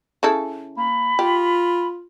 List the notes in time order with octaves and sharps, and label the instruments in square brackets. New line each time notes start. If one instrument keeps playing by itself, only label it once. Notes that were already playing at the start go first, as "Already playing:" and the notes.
[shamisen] C#3 E4 A4
[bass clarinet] A#3 [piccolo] B5
[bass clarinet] F4 [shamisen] G4